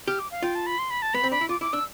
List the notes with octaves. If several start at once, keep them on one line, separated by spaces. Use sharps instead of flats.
G4 F6
D6
F5
F4 G5
A5
B5
C6
B5
A5
B3 B5
C4
D4 B5
E4
F4 D6
E4 D6
D4 E6